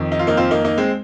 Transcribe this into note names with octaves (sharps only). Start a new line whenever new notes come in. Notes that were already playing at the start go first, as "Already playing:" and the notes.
Already playing: F2 D#3
D#4
F4
A#3 D#4
C4 F4
A#3 D#4
A#3 D#4
G#3 C4